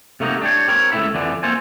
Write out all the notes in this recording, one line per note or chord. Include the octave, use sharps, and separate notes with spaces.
C3 A3 A#3 D#4 F#4
D4 G4 C#5
C4 A#4 C#5
C#2 A3 B3 E4 E5 B5
F2 D3 E3 D4
A#3 C4 F4 A4 C5 G#5